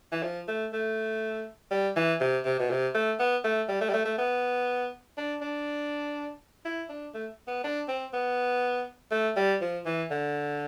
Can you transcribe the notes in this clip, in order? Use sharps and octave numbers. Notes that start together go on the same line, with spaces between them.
E3
F3
A3
A3
G3
E3
C3
C3
B2
C3
A3
B3
A3
G3
A3
G3
A3
A3
B3
D4
D4
E4
D4
A3
B3
D4
C4
B3
A3
G3
F3
E3
D3